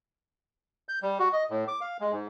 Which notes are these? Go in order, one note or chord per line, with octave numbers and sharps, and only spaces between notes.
G6
G3
F#4
D#5
A2
D6
F5
G#3
G#2